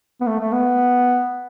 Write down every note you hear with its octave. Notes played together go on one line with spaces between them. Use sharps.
B3
A3
A3
B3